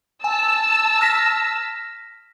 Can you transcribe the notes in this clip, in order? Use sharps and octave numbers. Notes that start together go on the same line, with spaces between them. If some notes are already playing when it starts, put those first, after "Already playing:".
G#5 A5 E6
F6 A#6 B6